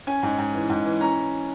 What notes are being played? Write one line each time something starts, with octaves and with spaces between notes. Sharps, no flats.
C#4 G#5
G#2
G#2
E3
G#2
E3
C#4 A#5